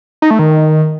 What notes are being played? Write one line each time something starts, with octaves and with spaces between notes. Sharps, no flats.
D#4
A3
D#3